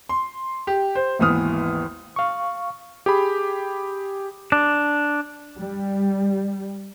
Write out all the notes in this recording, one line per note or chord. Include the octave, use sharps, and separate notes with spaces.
C6
G4
C5
G#1 D#2 E3 B3 D#6 F6
F5 C#6
G4 G#4 B5
D4
G3